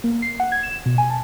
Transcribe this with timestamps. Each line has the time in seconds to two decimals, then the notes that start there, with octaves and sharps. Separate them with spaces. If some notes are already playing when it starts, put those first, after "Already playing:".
0.04 A#3
0.22 C7
0.40 F#5
0.52 G#6
0.63 E7
0.86 B2
0.98 G#5
1.10 A5